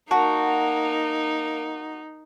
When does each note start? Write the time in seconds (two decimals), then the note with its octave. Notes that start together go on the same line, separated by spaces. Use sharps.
0.11 A#3 D#4 F#4 F#5 A5